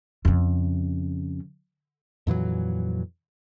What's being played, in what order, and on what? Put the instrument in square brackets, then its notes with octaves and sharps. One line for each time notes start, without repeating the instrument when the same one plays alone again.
[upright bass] F2 C#3
[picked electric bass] F2 A#2 E3 F#3